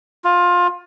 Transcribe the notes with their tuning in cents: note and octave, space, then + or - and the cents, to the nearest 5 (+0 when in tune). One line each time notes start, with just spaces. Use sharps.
F4 +20